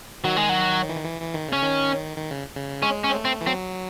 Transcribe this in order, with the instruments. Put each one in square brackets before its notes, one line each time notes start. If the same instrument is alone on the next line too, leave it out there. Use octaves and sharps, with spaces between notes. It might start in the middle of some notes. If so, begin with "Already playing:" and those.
[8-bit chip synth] D#3 [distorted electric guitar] F#3
[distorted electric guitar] G#3
F#3
[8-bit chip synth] E3
D#3
E3
E3
D#3
[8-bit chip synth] C#3 [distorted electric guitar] C#4
[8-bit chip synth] D#3
D#3
C#3
C#3
[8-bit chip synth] G#3 [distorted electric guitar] C#4
[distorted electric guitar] C#4
[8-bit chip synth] C4
A3
[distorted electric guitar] C4
[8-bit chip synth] E3
[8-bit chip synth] F#3 [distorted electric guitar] C4